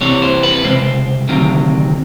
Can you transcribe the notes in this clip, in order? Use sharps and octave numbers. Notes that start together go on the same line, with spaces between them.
C2 C3 E3 C#5
C5
B4
C#2 C3 C5
D2 C3 D#3 F#3